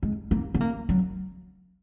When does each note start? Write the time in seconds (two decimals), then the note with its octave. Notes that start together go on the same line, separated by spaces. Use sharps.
0.03 G#3
0.31 A#3
0.54 B3
0.61 A#3
0.89 F#3